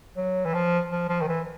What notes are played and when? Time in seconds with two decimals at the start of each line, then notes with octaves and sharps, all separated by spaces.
0.17 F#3
0.45 E3
0.54 F3
0.91 F3
1.09 F3
1.21 D#3
1.28 E3